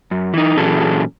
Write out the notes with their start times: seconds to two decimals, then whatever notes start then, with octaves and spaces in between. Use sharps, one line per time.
0.11 F#2
0.34 E3 D#4
0.57 A#2 E3 F#3 C#4 G#4 A4